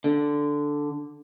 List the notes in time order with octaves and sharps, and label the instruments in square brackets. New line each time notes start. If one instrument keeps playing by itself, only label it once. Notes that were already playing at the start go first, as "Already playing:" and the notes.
[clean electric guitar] D3